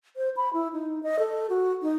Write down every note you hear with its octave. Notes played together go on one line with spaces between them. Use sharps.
C5
B5
E4
D#4
D#5
A4
F#4
D#4